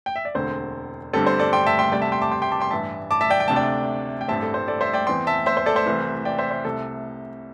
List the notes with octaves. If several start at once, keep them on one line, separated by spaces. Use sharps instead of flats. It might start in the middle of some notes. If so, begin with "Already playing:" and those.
G5
E5
D5
E1 D2 D3 C4 C5
G1 G2 D3 G3 C4 A4
C5
A4 D5
G5 C6
E5 A5
G5 C6
D2 C3 G3 D5 G5
E5 A5
G5 C6
A5 D6
G5 C6
G5 C6
A5 D6
G5 C6
A1 G2 E3 E5 A5
A5 D6
E5 A5
D5 G5
G5
D2 C3 A3 D4 A5
D5 G5
G5
A1 G2 G3 C4 E5 A5
A4
C5
A4 D5
C5 E5
D5 G5
E2 E3 C4 G5 C6
E5 A5
C5 E5
C5
A4 D5
C5 E5
C2 C3 E3 A3
D5 G5
C5 E5
C5
C2 C3 A3 A4